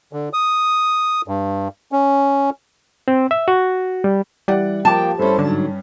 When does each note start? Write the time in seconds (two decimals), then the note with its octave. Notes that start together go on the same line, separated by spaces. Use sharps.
0.13 D3
0.33 D#6
1.28 G2
1.92 C#4
3.08 C4
3.31 E5
3.48 F#4
4.04 G3
4.48 E3 G3 D5 F#5
4.85 F3 A#3 G5 A5 D6
5.19 G2 C#4 E4 A4 C5
5.39 G#2 D3 F#3